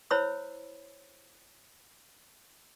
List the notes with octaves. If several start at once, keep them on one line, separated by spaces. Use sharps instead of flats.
E4 C5 C#5 B5 E6